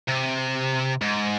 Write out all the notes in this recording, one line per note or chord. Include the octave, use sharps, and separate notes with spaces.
C3
G#2